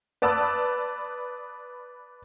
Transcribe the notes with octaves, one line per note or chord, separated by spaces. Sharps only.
B4 D5 A5 D#6 E6 F#6